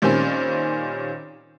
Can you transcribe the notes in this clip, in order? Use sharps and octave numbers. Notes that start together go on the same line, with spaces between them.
A#2 D#3 G3 C4 C#4